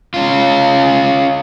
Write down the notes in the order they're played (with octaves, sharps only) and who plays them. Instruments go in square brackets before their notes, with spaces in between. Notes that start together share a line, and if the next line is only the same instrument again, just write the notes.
[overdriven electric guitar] C#4 F4